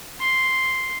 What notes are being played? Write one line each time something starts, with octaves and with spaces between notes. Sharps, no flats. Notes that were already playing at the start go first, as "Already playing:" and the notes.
C6